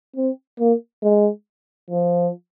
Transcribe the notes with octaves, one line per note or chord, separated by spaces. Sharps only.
C4
A#3
G#3
F3